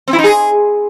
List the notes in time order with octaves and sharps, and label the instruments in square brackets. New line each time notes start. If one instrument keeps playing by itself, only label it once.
[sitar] C4
E4
D#4
G#4